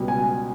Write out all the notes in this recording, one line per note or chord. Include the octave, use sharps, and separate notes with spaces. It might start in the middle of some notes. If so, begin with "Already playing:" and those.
Already playing: C#2 B2 G3
G#5